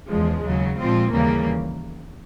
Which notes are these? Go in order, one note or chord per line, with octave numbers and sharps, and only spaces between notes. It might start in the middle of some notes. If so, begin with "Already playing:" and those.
E2 C#3 F3 G#3
D#2 C#3 F#3
A#2 F3 G#3 C4 F4
D#2 C#3 E3 G3 A#3